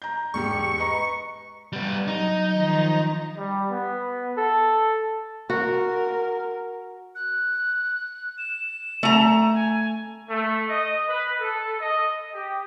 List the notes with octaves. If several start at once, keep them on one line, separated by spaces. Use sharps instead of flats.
A#5 G6
E1 G#2 G4 C#6
B4 D#5 A#5
G3 B3
F#3 D#4
D#3 F3
G3
B3
A4
F#4 A#4
F#6
E7
A3 A#5
G#5
A3
D#5
B4
A4
D#5
G4